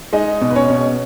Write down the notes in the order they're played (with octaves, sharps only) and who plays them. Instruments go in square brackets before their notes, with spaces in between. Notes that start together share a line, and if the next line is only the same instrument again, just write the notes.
[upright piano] G#3 D#4 D#5
B2
B4
C#4 C#5
B2